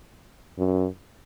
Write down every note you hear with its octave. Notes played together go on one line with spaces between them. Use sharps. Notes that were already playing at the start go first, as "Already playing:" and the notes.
F#2